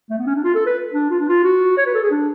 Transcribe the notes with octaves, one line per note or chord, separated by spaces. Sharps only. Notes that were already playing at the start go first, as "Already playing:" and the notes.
A3
B3
C#4
D4
F4
A4
B4
D4
F4
D4
F4
F#4
C#5
B4
A4
G#4
D4